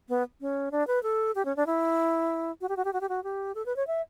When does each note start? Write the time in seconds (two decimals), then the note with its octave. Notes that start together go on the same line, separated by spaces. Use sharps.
0.09 B3
0.41 C#4
0.72 D4
0.87 B4
1.03 A4
1.35 G4
1.45 C#4
1.56 D4
1.66 E4
2.61 F#4
2.69 G4
2.77 F#4
2.85 G4
2.93 F#4
3.01 G4
3.09 F#4
3.24 G4
3.55 A4
3.66 B4
3.76 C#5
3.87 E5